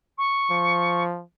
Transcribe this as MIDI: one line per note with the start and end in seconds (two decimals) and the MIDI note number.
0.18 1.03 85
0.50 1.23 53